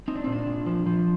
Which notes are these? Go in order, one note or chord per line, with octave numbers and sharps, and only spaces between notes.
C4 D#4
D4
A#2 C4
D4
A#2
F3
F3